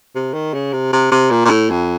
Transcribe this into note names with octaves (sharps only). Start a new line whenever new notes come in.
C3
D#3
C#3
C3
C3
C3
A#2
A#2
A2
F2